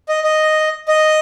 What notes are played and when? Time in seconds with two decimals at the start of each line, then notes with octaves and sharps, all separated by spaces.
0.09 D#5
0.24 D#5
0.88 D#5